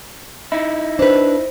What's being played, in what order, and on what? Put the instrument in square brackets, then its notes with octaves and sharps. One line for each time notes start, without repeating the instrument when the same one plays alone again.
[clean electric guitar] D#4 E4
[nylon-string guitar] D4 B4 [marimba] C5